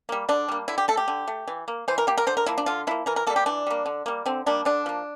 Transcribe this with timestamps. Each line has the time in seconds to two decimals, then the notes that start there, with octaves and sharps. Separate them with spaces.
0.09 G3 A#3
0.29 D3 D4
0.48 G3 A#3
0.68 D3 E4
0.78 G4
0.88 A3 A4
0.97 G4
1.08 D3
1.28 A3
1.47 E3
1.68 A#3
1.88 E3 C5
1.98 A#4
2.07 A#3 G4
2.18 A#4
2.27 D3 C5
2.37 A#4
2.46 F3 A#3 E4
2.58 D4
2.66 D3 F4
2.87 F3 A#3 E4
3.06 E3 A#4
3.16 A#4
3.27 A#3 A4
3.30 G3
3.36 G4
3.46 E3 D4
3.67 G3 A#3
3.86 D3
4.06 G3 A#3
4.26 D3 C4
4.46 G3 A#3 D4
4.65 D3 D4
4.86 F3 A#3